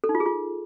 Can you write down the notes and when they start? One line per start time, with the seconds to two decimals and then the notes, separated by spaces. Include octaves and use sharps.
0.04 A4
0.09 D#4
0.15 F4
0.20 G#4
0.26 F4